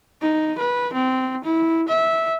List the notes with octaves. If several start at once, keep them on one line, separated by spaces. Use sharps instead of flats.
D#4
B4
C4
E4
E5